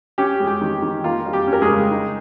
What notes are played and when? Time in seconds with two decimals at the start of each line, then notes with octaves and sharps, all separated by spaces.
0.18 C#4 G4
0.40 G#3
0.47 G4
0.61 D#3
0.82 D#3
1.04 A#3 F4
1.26 G3
1.33 G4
1.48 C#4
1.53 A#4
1.62 G#3 G#4
1.69 C#3
1.91 D#4